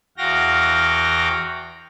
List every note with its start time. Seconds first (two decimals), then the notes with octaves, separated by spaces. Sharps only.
0.18 E2 F#4 F5 G5 A#6